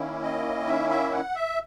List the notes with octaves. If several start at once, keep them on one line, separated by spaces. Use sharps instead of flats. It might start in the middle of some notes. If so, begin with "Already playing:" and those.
Already playing: D#3 A#3 C#4 E4
D#5
E5
E5
F#5
E5